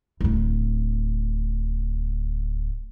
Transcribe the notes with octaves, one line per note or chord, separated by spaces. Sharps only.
D1 A2